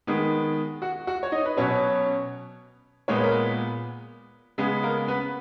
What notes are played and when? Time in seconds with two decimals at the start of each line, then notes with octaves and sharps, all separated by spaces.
0.07 D#3 G#3 B3
0.82 F#4 F#5
1.07 F#4 F#5
1.23 C#5
1.32 D#4 D#5
1.45 B4
1.57 B2 F#3 B3 C#4 C#5
3.08 A#2 G#3 B3 C#5
3.15 B4
3.23 A#4
3.31 B3 B4
4.58 C#3 G#3 B3
4.83 A#3 A#4
5.08 B3 B4